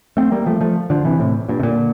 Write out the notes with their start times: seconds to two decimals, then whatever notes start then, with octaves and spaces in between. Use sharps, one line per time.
0.17 A3 C4
0.32 G3 A#3
0.46 F3 A3
0.61 F3 A3
0.90 D3 F3
1.05 C3 E3
1.20 A2 C3
1.49 G2 A#2
1.60 C3
1.63 A#2 D3